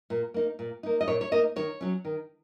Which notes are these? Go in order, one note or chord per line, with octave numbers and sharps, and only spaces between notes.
A#2
A#3 D#4
A#2
A#3 D#4
D#5
A#2 C#5
C#5
A#3 D#4 D#5
D#3 C#5
F#3 C#4
D#3